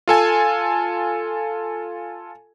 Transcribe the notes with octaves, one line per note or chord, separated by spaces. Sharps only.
F4 A4 G#5